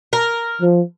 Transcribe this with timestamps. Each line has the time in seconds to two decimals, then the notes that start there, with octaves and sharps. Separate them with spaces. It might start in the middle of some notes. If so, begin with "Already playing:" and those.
0.13 A#4
0.61 F3